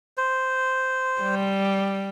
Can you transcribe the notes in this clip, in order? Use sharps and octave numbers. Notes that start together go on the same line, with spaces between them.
C5
G3